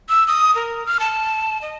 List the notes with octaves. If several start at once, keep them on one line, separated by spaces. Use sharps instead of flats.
E6
D#6
A#4
F6
A5
D#5